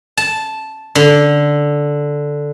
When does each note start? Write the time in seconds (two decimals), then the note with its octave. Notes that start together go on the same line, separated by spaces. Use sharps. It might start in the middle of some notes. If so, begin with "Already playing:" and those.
0.17 A5
0.95 D3